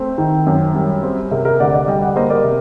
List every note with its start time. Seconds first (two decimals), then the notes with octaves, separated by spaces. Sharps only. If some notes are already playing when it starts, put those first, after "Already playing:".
Already playing: A3 C4
0.18 D#3
0.47 F#2
0.74 G3
1.03 C4
1.31 C3 A#4
1.45 A#4
1.60 D2 D5 F#5
1.73 D5 F#5
1.88 G3 D#5 G5
2.02 D5 F#5
2.16 A#3 C5 D#5
2.30 A#4 D5
2.44 C3